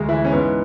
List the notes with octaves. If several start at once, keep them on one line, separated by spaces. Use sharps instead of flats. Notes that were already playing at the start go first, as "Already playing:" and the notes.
Already playing: D2 G#3
E3 E4
C#4
G#2 B3